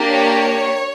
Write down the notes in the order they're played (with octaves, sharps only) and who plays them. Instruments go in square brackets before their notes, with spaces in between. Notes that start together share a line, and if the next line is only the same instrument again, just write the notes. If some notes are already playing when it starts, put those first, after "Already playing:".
Already playing: [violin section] A#3 D4 G4
C#5